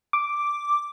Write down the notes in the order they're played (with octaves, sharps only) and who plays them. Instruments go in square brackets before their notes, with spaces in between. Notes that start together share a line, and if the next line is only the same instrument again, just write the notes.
[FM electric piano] D6